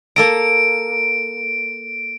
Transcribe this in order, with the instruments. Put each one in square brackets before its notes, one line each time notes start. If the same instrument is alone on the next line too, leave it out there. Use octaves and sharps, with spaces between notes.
[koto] A#3 A4 A#5 [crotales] D7